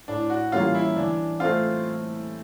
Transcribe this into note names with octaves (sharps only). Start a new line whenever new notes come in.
A2 D4
F#4
E3 G3 A#3 C#4 F4
E4
E3 D4
A3 C4 F4